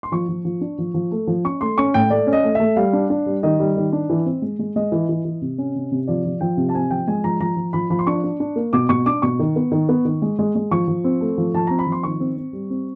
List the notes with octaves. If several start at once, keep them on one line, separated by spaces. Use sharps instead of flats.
C6
F3 C#6
F3
F3
D4
F3
F3
A3
F3
C#4 C#6
A3 C6
C#4 C#6
A2 G5
A3 D5
C#4
D#5
A3
A3 E5
G3 F5
D4
D4
G3
D#3 D#5
G3
D#3
D4
E3
C4
G#3
G#3
G#3 D#5
E3
E3
E3
C3
C#4
C3
C3
F3 D5
F3
F3 G5
C3
A5
C4 G#5
F3 G5
G#3 G#5
F3 A#5
F3 A#5
F3
F3 B5
F3 B5
C6
D4 C#6
D4
D4
A#3
B2 D6
B2 C#6
D4 D6
B2 C#6
D#3
B3
D#3
B3
D#3
G#3
G#3
G#3
F3 C#6
F3
C4
A3
F3
F3 A5
C4 A#5
B5
F3
C6
D#3 C#6
C4
C4
G3
C4